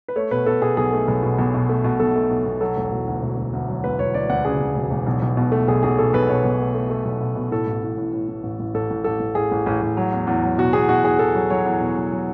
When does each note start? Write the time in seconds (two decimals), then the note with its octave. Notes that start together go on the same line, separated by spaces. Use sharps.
0.08 B4
0.16 A3 C#5
0.31 B2 B4
0.46 B2 A4
0.62 B2 G#4
0.77 B1 G#4
0.93 A3
1.08 B1
1.22 B2
1.38 B1
1.54 B2
1.69 A3
1.84 B2
2.00 B1 A4
2.16 A3
2.31 B1
2.45 B1
2.61 F#3 A4
2.76 E1
2.92 E1
3.07 D2
3.22 E1
3.37 D2
3.53 D2
3.68 F#3
3.84 E1 B4
3.99 E1 C#5
4.14 D2 D5
4.30 D2 F#5
4.45 C#3 G#4
4.60 D2
4.75 E1
4.91 E1
5.07 B1
5.22 B1
5.37 B2
5.52 A3
5.68 B1 G#4
5.83 B1 G#4
5.98 B2 A4
6.13 B1 B4
6.28 B2 C#5
6.44 B1
6.60 A3
6.75 A3
6.90 A3
7.05 B1
7.21 B2
7.36 B2
7.51 A2 A4
7.67 A1
7.82 A2
7.97 A2
8.13 A2
8.28 A2
8.43 A1
8.59 A1
8.74 A1 A4
8.90 A1
9.04 A1 A4
9.20 A1
9.35 A1 G#4
9.51 A1
9.66 A1
9.82 A1
9.97 F#3
10.13 E2
10.27 E2
10.44 F#3
10.58 B2 F#4
10.73 E2 G#4
10.89 B2 F#4
11.04 E2 G#4
11.19 E2 A4
11.35 F#3
11.50 F#3 C#5
11.66 E2
11.81 B2
11.96 F#3
12.12 F#3